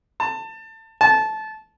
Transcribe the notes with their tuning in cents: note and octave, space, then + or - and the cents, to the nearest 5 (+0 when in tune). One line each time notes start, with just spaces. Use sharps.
A5 +25
A5 -20